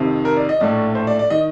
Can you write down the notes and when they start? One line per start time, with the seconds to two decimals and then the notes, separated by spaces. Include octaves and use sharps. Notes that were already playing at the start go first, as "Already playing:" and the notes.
Already playing: F2 C3 D#3
0.25 A#4
0.37 D5
0.49 D#5
0.60 A#1 A2 A3 D5
0.95 C5
1.07 D5
1.19 D5
1.30 D#3 D#5